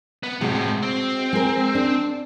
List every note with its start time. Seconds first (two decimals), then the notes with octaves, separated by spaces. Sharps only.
0.23 B3
0.41 A2 C3 G#3 F#4
0.83 C4
1.33 G#3 A#4
1.75 D4